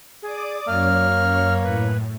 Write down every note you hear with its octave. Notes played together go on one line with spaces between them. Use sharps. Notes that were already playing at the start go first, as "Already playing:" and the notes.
G#4 D5 D6 D#6
F#2 A#3 C#5 F6
A2 B4